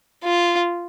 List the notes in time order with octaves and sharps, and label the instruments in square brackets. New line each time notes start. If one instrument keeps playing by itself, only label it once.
[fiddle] F4